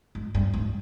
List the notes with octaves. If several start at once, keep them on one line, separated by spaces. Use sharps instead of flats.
G#2
G2
G#2